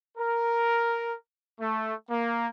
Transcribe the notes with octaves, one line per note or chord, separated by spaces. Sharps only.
A#4
A3
A#3